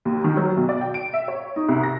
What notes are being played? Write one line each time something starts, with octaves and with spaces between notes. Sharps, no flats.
D#2
D#3
F#3
B1
D5
G5
D7
E5
C#5
D#4
C2
A#6